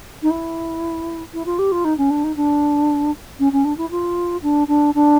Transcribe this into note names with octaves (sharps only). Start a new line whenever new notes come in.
D#4
E4
E4
F4
G4
F4
D#4
C#4
D4
D#4
D4
C#4
C#4
D4
E4
F4
D4
D4
D4